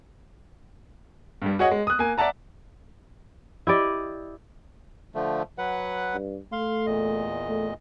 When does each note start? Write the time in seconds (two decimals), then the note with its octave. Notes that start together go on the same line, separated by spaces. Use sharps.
1.42 G2 G3
1.59 F#4 G#4 C#5 D#5 F#5
1.71 G#3
1.87 D#6 F#6
1.99 A#3 G#5
2.18 D5 E5 F#5 A5 A#5
3.67 E4 G4 D5 D#5
5.15 D3 F3 A3
5.58 F#3 B4 F#5
6.14 G2
6.52 A3 F5 C6
6.86 E2 A#2 D#5
7.48 A3